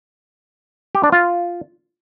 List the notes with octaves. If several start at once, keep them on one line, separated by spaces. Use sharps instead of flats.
G4
D4
F4